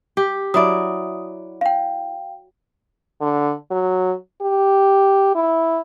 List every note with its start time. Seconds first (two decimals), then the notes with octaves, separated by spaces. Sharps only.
0.17 G4
0.54 F#3 E4 D5 D#6
1.61 F5 G5
3.21 D3
3.71 F#3
4.41 G4
5.35 E4